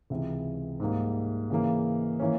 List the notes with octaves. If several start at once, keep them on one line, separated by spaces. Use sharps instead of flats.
C#2 C3 E3
G#2 G3 A#3
C#3 E3 A#3
E3 A#3 C#4